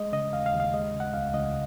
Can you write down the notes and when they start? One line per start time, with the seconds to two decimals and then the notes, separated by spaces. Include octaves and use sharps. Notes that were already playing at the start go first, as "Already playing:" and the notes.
Already playing: G#3 D#5
0.13 C#3 D#5
0.33 D#2 F5
0.46 F5
0.54 D#2
0.60 F5
0.74 G#3 D#5
0.94 C#3
1.00 F#5
1.14 C#2 F5
1.33 C#2 D#5